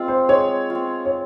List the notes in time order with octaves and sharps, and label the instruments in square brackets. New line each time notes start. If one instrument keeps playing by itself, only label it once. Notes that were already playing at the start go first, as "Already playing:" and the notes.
Already playing: [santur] G#3 C4 F4
[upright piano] C5
[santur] G#3 [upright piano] C#5
[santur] C4 F4
[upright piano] C#5